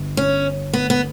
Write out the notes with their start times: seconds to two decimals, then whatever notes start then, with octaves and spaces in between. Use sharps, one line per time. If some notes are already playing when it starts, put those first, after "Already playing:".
Already playing: G1
0.17 C#4
0.73 B3
0.90 B3